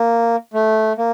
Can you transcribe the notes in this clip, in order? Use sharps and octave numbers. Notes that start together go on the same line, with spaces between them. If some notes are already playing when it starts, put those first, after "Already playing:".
Already playing: A#3
A3
A#3